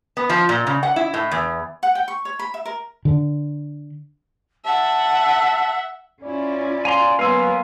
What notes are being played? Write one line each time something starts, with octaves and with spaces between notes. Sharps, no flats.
B3
F3
A#2
C#3
F#5
E4
A2
E2
F#5
G5
C#6
C#5
B5
E5
A#4
D3
E5 F#5 A5
C#4 E4 F4 D5
F5 G#5 A#5 C6
F#3 A#3 B3 B4 F5 G#5 C6 E6